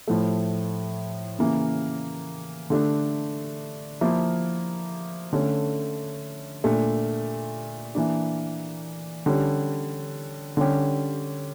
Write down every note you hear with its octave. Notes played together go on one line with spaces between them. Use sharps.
A2 F3 A3
C#3 E3 A#3
D3 A3 D4
F3 A#3 E4
D3 A3 C#4
A#2 A3 D4
E3 A#3 D4
D3 G3 C#4
D3 G3 C#4 G4